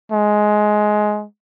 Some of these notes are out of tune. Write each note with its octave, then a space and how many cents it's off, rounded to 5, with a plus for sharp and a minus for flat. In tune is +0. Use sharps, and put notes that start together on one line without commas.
G#3 +15